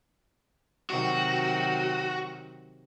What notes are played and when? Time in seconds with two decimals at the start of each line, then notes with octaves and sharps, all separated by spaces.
0.90 C3 D#3 F#3 F#4